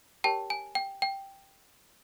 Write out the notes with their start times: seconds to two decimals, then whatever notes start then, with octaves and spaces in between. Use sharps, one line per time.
0.24 G4 A#4 C#5 G5 A5
0.50 G#5
0.75 G5
1.02 G5